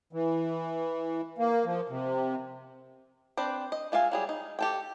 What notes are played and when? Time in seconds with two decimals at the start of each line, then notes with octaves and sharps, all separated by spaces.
0.13 E3
1.38 A#3
1.65 F3
1.89 C3
3.37 C4 D4 B4 C5
3.72 D#5
3.92 G#3 F4 E5 F5 G#5
4.12 F#3 G3 G#4
4.29 D#4
4.59 G4 A4 G5